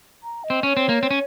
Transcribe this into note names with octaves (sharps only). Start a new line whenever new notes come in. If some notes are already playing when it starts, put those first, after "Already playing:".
A#5
D#5
C4
C#4 C#5
C4
A#3
C4
C#4